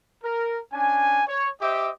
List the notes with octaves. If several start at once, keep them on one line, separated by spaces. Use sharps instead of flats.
A#4
C#4 D4 G#5
C#5
G4 C5 D#5 E5 D6